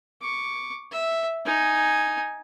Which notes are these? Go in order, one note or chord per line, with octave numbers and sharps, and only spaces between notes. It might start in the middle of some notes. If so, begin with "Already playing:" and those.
C#6 D6
E5
D#4 G#5